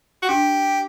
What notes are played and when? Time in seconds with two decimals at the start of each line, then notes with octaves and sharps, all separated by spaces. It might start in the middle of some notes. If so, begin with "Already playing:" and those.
0.23 F#4
0.29 D4 G4